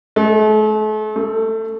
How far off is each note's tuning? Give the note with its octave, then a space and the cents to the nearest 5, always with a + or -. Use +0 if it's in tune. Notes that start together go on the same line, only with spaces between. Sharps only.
A3 -40
A3 +20